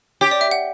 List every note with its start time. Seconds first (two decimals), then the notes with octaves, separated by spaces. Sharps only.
0.21 G4 C#5
0.31 D5
0.41 E5
0.51 F#5